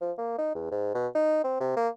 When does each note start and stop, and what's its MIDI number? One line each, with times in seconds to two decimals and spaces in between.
0.01 0.12 53
0.18 0.35 58
0.38 0.54 63
0.55 0.67 40
0.71 0.92 44
0.94 1.07 47
1.15 1.43 63
1.44 1.57 60
1.60 1.74 48
1.77 1.89 58